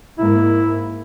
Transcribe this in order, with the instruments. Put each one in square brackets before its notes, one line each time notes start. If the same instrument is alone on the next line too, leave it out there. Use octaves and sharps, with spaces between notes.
[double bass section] G#2 A#3 [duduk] E4